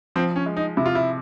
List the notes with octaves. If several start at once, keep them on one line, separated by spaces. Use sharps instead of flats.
F3 C4
C#4
G#3
D#4
C3 E4
F4
E4